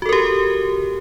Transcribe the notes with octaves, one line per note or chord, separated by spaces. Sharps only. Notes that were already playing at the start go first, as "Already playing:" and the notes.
F#4 G4 A4 A#4